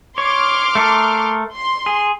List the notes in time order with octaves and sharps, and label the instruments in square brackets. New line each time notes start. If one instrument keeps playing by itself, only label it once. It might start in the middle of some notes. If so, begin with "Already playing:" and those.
[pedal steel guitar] C#5 [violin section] C6 D6 F6
[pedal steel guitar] A3 A4 A#4
[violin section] C6
[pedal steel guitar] G#4